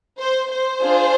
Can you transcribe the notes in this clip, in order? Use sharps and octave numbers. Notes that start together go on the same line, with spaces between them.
C5
C5
D4 F4 G#4